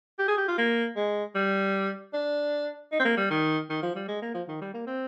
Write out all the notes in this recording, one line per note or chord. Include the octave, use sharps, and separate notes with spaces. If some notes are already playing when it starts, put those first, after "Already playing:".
G4
G#4
G4
F4
A#3
G#3
G3
D4
D#4
C4
A#3
G3
D#3
D#3
F3
G3
G#3
A#3
F3
D#3
G3
A#3
C4